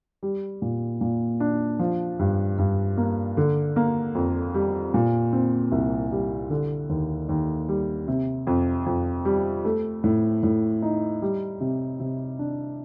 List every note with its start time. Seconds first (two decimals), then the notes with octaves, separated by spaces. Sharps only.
0.23 G3
0.62 A#2
1.01 A#2
1.40 D4
1.79 F3
2.19 G2
2.58 G2
2.97 A#3
3.37 D3
3.76 A#3
4.15 F2
4.54 G3
4.94 A#2
5.33 C4
5.72 C2
6.12 G3
6.50 D3
6.89 D#2
7.29 D#2
7.68 G3
8.08 C3
8.47 F2
8.86 F2
9.25 G3
9.65 A3
10.04 A2
10.43 A2
10.82 D#4
11.22 G3
11.61 C3
12.00 C3
12.39 D4